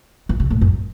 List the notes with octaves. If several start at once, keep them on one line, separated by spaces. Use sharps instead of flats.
E3
C3
A2
F#2